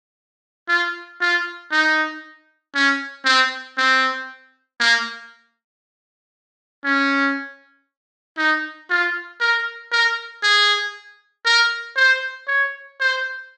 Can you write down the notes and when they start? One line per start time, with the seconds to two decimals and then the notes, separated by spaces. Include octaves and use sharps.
0.69 F4
1.21 F4
1.72 D#4
2.75 C#4
3.25 C4
3.77 C4
4.80 A#3
6.84 C#4
8.38 D#4
8.90 F4
9.40 A#4
9.92 A#4
10.43 G#4
11.45 A#4
11.96 C5
12.47 C#5
13.00 C5